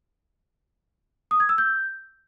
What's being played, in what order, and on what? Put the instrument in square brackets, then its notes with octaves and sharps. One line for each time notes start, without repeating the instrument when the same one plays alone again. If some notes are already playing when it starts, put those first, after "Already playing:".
[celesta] D#6
G#6
E6
G6